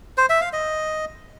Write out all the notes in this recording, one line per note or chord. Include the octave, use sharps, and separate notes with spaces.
C5
E5
F5
D#5